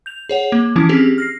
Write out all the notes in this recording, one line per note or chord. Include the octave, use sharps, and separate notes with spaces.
G6 F7
G#4 C#5 F#5
A#3
E3 F3 C#4 E4
C4 C#4 G4 G#4
F6 A#6 C7